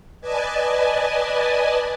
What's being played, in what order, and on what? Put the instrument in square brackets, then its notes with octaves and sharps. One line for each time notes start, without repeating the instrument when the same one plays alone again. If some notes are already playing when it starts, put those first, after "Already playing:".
[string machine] B4 D5 D#5 G#5 A5